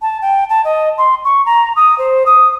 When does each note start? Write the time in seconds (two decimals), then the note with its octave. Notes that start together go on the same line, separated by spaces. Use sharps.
0.01 A5
0.21 G5
0.49 A5
0.64 D#5
0.97 C6
1.24 C#6
1.45 A#5
1.76 D#6
1.98 C5
2.26 D#6